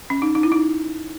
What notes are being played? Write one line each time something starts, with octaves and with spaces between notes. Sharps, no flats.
C#4
D#4
D#4
E4
D#4